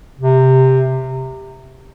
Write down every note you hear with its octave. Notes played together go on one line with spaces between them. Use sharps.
C3